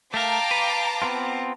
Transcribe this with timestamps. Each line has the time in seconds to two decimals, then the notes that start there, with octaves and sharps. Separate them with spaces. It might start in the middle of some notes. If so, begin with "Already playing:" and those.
0.14 A3 A#4 F5 G5 A5 A#5 D6
0.51 B4
1.02 B3 C4 F4